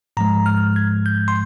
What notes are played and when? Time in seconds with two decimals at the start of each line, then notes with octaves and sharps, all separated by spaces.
0.17 G#2 F3 G#3 A#5
0.46 F6
0.76 G#6
1.06 G6
1.28 C6